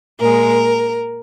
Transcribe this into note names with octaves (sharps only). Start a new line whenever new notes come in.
A#2 G#3 A#4